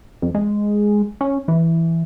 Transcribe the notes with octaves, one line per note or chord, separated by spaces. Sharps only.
F2
G#3
C#4
E3